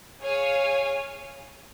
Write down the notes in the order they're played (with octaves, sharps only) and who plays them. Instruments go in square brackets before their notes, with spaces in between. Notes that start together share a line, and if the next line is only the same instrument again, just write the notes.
[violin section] G#4 C#5 F5 G#5